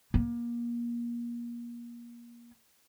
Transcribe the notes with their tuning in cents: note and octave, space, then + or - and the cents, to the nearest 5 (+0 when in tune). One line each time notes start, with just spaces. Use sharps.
A#3 +30